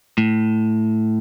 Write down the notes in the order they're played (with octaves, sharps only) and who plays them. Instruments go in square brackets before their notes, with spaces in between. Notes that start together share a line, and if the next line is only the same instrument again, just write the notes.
[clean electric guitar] A2